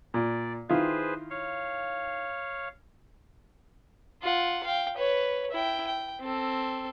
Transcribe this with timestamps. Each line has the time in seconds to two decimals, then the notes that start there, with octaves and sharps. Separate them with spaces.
0.14 A#2 D5
0.69 D#3 E4 F4 G#4 B4 C5
1.30 C#5 F5
4.22 F4 F#5
4.64 F5 G5
4.97 B4 C#5
5.51 E4 G5
5.87 G5
6.21 C4 A4